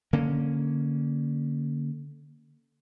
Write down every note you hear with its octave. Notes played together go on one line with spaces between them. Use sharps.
D3 A#3 C#4